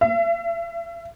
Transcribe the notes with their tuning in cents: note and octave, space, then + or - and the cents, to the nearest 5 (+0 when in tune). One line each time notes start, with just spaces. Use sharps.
E5 +40